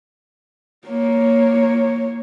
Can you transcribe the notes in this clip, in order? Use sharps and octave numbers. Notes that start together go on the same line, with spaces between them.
A#3 C#5